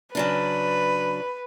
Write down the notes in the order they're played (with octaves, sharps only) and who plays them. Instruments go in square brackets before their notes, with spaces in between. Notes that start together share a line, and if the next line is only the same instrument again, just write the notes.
[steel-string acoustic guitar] C#3 F#3 D4 [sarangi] B4